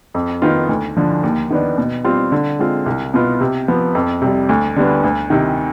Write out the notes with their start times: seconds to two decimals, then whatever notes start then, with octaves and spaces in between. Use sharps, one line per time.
0.14 F2
0.42 D#3 B3 F4
0.69 D2
0.97 D3 F3
1.23 D#2
1.51 D#3 B3 D4
1.78 B2
2.05 G3 C4 F4
2.32 D3
2.59 G#3 C4 F4
2.86 C2
3.14 B2 B3 F4
3.41 C3
3.68 F3 B3
3.95 F2
4.22 C3 G3
4.49 D2
4.76 D3 G3 B3
5.04 D2
5.30 C3 D#3